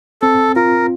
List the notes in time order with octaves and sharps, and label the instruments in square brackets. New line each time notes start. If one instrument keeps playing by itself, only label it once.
[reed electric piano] C4 [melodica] A4
[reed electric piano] F4 [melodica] A#4